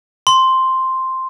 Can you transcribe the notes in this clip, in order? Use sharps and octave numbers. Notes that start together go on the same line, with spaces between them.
C6